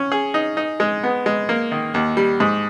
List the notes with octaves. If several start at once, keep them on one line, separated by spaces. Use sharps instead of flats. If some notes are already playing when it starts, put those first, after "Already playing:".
Already playing: C#4
G#4
D#4
D#4
G#3
B3
G#3
A#3
D#3
D#2
G3
G#2